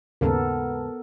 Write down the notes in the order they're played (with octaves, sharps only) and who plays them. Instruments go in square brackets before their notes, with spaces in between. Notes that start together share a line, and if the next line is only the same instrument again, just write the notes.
[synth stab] D#2 G#2 C#3 [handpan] B3 A4 A#4